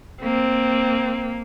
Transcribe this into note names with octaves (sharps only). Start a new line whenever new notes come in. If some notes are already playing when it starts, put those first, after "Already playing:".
A#3 C4